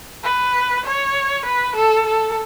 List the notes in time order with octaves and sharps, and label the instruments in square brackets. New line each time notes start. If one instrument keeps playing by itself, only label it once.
[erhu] B4
C#5
B4
A4
A4